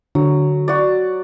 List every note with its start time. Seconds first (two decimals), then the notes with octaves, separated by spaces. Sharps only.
0.15 D3 F#3
0.68 F#4 D5